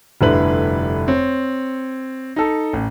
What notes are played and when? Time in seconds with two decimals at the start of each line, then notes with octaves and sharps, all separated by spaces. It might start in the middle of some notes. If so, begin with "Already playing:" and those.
0.21 F1 G2 D3 E4 B4 F#7
1.08 C4 C#5
2.36 D#4 A4
2.73 A1